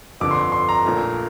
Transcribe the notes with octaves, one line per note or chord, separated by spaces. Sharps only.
G1 F2 D3 D6
C6
C6
A#5
A#1 A#2 A3